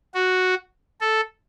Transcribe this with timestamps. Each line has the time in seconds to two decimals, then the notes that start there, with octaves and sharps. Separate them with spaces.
0.14 F#4
1.01 A4